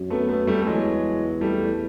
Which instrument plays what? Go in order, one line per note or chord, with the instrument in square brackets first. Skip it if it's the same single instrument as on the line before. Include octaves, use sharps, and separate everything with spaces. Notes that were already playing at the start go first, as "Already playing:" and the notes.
Already playing: [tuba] F#2
[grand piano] A3 B3
A3 B3
G3 A3
A3
[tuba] E2 [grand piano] F#3 G#3
[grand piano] G3 A3